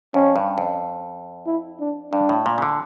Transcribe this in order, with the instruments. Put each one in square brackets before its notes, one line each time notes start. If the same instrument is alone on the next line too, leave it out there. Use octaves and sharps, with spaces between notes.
[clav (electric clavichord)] F2 [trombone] C#4
[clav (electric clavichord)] G2
F2
[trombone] E4
D4
[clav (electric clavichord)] G2 [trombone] D4
[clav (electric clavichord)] A2
A#2
C#3
D3